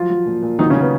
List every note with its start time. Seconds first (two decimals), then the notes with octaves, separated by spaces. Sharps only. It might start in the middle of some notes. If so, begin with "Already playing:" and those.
Already playing: F3 F#3 F4
0.10 F#3
0.26 A#2
0.42 A#2
0.59 D#3 F#3 D#4
0.70 C#3 C#4
0.76 F#3
0.81 B3